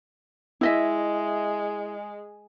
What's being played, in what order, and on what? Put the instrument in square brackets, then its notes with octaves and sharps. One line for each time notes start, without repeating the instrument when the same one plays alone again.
[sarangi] G#3 [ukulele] E4 D#5 E5